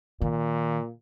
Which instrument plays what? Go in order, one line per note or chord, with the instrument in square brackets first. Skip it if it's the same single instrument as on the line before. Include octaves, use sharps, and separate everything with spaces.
[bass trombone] A#2 [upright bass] D#3